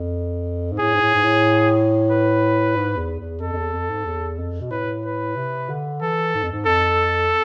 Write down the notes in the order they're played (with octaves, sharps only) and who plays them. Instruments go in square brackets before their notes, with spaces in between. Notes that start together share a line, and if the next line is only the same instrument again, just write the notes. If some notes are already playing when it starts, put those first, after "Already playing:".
Already playing: [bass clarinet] F2
G#2
[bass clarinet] A2 [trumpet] G#4
[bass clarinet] G#2
A2
G#2
A2
[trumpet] B4
[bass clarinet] G#2
E2
E2
[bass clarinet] F2 [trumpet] A4
[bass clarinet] F2
E2
F2
G#2
E2
F2
B2
[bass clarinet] A2 [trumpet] B4
[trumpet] B4
[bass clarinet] C3
D3
[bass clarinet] E3 [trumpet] A4
[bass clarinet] G#2
F2
G#2
[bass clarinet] F2 [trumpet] A4